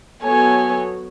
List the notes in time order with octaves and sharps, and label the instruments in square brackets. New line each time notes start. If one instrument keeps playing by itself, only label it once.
[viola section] F#3 B3 F#4 A4 C#5 [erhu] G#5